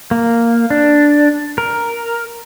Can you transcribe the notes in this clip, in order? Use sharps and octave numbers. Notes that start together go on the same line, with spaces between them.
A#3
D4
A#4